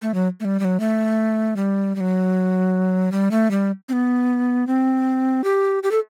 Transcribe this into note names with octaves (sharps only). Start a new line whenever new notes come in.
A3
F#3
A3
G3
G3
F#3
A3
G3
G3
F#3
G3
A3
G3
C4
B3
C4
G4
G4
A4